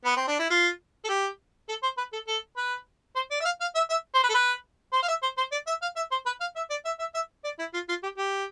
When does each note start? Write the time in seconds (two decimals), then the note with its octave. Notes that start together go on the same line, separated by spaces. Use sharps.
0.05 B3
0.17 C4
0.27 D4
0.39 E4
0.50 F4
1.05 A4
1.09 G4
1.69 A4
1.83 C5
1.97 B4
2.13 A4
2.28 A4
2.57 B4
3.16 C5
3.31 D5
3.40 E5
3.45 F5
3.61 F5
3.75 E5
3.90 E5
4.14 C5
4.24 B4
4.29 A4
4.34 B4
4.93 C5
5.02 F5
5.08 E5
5.23 C5
5.38 C5
5.52 D5
5.67 E5
5.82 F5
5.96 E5
6.11 C5
6.26 B4
6.41 F5
6.56 E5
6.70 D5
6.85 E5
6.99 E5
7.14 E5
7.44 D5
7.59 E4
7.74 F4
7.89 F4
8.03 G4
8.17 G4